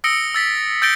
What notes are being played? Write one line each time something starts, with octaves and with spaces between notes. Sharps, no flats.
D#6 E6 A#6 C#7 D7 G7
E6 A6 B6
E6 G6 A6 A#6 D7 G7